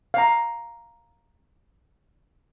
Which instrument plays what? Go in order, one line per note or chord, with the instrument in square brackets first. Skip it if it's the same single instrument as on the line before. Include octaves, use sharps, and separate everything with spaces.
[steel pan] F5 A#5